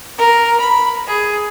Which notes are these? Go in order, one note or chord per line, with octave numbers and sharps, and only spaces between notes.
A#4
B5
G#4